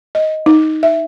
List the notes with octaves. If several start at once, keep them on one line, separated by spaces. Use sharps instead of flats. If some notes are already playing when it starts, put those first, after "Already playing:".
D#5
D#4
E5